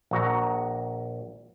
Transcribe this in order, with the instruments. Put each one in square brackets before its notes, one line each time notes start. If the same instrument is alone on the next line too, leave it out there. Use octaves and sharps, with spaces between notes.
[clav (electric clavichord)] A#1 F#4 A#5